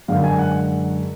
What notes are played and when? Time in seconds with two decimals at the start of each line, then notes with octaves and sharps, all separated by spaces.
0.08 F#2 D3 G#3 F5
0.24 G#5
0.39 F#5